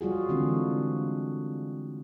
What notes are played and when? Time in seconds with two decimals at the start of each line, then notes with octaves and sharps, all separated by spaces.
0.01 G3 F4 F#4 G#4
0.29 D3 E3 G#3 C4 D4